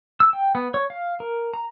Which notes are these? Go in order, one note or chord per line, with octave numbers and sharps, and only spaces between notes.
E6
G5
B3
C#5
F5
A#4
A#5